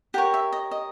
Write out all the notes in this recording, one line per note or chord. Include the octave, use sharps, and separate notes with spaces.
G4 A#4 C#5 F#5
E5
D#5
D#5